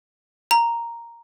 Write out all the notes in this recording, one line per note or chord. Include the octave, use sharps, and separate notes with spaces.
A#5